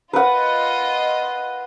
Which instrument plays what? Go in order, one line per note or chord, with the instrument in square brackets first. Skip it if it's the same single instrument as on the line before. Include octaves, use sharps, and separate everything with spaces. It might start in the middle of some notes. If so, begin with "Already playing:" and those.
[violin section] F4 D#5 [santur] B4 F#5